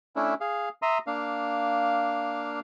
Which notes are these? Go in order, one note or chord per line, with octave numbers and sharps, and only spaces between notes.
A3 C#4 D4 E4
G#4 F5
E5 A#5 C6 D#6
A#3 D4 F5